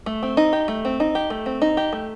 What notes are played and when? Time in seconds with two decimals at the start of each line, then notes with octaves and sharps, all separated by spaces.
0.06 A3
0.23 C4
0.37 D#4
0.53 G4
0.68 A3
0.85 C4
1.00 D#4
1.15 G4
1.30 A3
1.46 C4
1.62 D#4
1.77 G4
1.93 A3